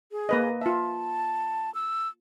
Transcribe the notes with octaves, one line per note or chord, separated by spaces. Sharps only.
G#4
A#3 B4 D#5
F4 E5 A5
E6